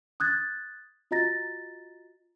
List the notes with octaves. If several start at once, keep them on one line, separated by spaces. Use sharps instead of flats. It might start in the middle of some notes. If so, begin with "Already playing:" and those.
D#6 F#6 G#6 A6
F4 F#4 D#5 A#5 A6 A#6